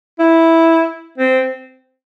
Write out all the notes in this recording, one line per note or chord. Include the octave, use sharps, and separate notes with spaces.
E4
C4